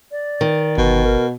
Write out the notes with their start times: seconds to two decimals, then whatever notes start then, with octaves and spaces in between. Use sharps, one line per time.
0.11 D5
0.41 D#3
0.78 G1 B2
1.03 A#4